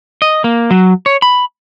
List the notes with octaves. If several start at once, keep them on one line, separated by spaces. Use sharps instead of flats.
D#5
A#3
F#3
C#5
B5